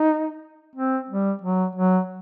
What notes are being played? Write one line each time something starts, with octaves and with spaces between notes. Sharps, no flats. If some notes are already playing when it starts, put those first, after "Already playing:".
Already playing: D#4
C4
G3
F#3
F#3